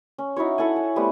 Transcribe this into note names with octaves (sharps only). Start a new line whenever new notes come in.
C#4
D#4 E4 F#4 C#5
E4 A4 F#5 G#5
G#5
G3 A3 B3 C4